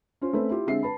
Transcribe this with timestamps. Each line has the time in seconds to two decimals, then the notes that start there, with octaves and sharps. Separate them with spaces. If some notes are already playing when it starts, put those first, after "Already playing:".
0.21 C#4 F4 C5
0.33 A3 C4 C#4 B4 C5
0.50 E4 F4 G4
0.67 D3 G#3 C4 E5 C7
0.83 B4 A5 B5